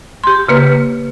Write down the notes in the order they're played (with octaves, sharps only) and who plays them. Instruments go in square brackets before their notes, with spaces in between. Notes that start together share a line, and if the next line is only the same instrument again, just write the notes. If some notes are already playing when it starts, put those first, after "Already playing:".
[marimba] G4 C6
C#3 A#3 B4